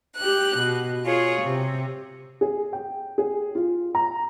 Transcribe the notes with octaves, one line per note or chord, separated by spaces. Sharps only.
G4 F#6
B2
F4 G#4 C#5
C3
G#4
G5
G#4
F4
A#5